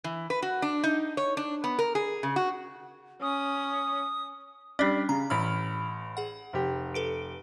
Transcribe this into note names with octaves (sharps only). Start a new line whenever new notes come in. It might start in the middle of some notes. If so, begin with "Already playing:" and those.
E3
B4
F#4
D4
D#4
C#5
D4
B3
A#4
G#4
C#3
F#4
C#4 D#6
G3 C#4 D4 D5
C#3 A#5
A1 B5 F6
G#4 F#5
F1 G4
A4 B4 D7